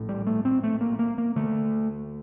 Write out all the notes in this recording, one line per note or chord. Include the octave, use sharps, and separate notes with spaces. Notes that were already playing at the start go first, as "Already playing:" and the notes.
Already playing: A#1 A2
G3
A3
C4
A3
A#3
A#3
A#3
D2 D3 A3